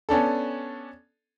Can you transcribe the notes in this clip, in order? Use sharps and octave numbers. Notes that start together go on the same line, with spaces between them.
B3 C#4 D4 A4